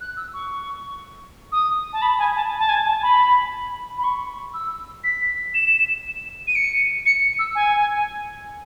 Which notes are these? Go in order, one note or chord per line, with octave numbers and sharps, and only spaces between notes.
F#6
E6
C#6
D#6
A5
B5
G#5
A5
A5
G#5
A5
B5
B5
C#6
E6
B6
E7
D#7
C#7
C#7
E6
G#5